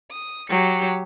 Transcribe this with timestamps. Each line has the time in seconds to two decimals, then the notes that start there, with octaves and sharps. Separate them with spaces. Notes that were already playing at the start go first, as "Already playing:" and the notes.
0.11 D#6
0.50 F#3 G4 C#7